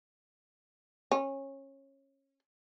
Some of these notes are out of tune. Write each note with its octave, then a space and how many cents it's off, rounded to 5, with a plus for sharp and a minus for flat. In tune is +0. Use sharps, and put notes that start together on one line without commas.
C#4 -20